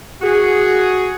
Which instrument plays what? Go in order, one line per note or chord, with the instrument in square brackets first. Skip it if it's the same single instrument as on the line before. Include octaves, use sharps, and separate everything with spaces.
[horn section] F#4 G#4